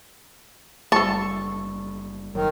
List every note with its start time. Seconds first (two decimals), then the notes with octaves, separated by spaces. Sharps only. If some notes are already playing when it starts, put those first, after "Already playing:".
0.92 F#1 G3 A4 A5 C#6
2.35 F#1 D#3 F#3